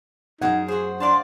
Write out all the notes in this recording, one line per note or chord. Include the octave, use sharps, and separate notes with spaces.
F#2 D#4 G#4 F#5 G#5
F#4 G#4 C5
D4 D5 F5 A5 C6